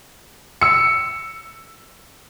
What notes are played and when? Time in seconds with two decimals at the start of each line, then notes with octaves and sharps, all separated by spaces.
0.61 E6 C#7